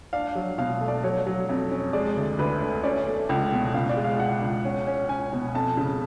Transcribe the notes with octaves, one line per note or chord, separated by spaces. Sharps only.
D4 F5
F#3
B2 F5
A3
D5
F#3 C#5
F#3
F2
C#4
G#3 D5
D2
D2 B4
D3
C#4 D5
A3
C#2
B2
C#2 F5
D5
G#3
F5
B2 F#5
C#2
C#4
C#4
C#4 G#5
B2
F2 A5
C#3